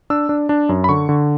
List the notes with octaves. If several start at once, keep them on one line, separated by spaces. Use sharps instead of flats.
D4 E6
D4
D4
F#2
B5
D3 C#6
D3